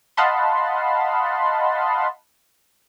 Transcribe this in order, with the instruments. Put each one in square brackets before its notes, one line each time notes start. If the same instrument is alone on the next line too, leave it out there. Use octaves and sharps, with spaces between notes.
[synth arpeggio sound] D#5 F5 F#5 A5 B5 C6